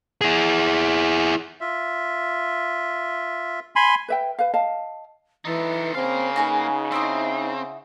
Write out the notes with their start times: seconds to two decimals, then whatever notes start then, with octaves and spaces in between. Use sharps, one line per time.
0.21 E4 G#4
1.61 F4 E5
3.76 G#5 B5 C6
4.08 B4 E5 G5
4.39 B4 F5
4.54 D#5 F5 A5
5.45 E3 D#4 A4
5.95 C#3 A#3 C4 F5
6.36 D#4 F#4 G#4 B4
6.92 C4 E4 F#4 D#5